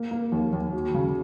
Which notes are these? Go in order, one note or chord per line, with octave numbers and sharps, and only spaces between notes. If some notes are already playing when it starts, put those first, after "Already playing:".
Already playing: A#3
A#3
D#2
D#2
F#3
C#3